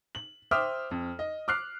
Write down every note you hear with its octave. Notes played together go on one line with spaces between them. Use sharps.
F#7
C5 E5 G5 D6 D#6 F6
F2
D#5
D6 F6 F#6 C7